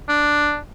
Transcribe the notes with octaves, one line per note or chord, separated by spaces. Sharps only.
D4